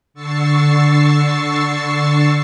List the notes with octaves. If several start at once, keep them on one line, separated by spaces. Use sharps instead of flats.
D3 C#6 E6 A6 C7